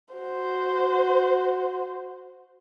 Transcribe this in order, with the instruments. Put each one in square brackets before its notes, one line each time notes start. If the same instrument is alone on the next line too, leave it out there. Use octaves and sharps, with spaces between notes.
[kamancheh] F#4 C5